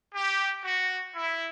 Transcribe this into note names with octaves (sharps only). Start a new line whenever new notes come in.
G4
F#4
E4